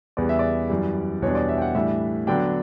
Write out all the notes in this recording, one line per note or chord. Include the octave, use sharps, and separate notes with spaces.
E2 C#3 G3 B3 D5
E5
D5
F#2 E3 G3
E2 B2 G3 D4 C#5
D5
E5
G5
F#5
A2 E3 G3 D4 E5
D3 F#3 B3 D4 G5